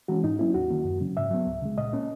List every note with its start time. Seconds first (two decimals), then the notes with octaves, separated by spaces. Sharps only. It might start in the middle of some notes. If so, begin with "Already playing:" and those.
0.08 E3 G#3 C#4 F#4
0.24 G#2 D#4
0.39 F#3 A#3 C#4 E4
0.54 D#2 F#4
0.70 D#3 A#3
0.85 F#2
1.00 C#3 F#3 C#4
1.17 G#2 E5
1.31 F#3 B3
1.47 C#2
1.62 C#3 G#3
1.78 A#2 D#5
1.93 A#3 C#4